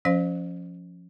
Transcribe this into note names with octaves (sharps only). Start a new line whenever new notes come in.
F3 C#4 C5 F5